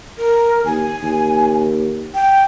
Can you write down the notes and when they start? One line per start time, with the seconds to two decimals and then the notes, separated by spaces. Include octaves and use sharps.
0.18 A#4
0.65 D#2 G#5
1.03 D#2
2.15 G5